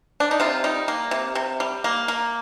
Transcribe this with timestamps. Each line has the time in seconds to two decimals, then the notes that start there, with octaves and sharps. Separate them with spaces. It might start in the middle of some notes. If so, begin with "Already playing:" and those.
0.20 D4
0.31 D#4
0.40 C3 F4
0.64 G3 D#4
0.88 A#3
1.11 C3
1.35 C3
1.60 G3
1.84 A#3
2.08 A#3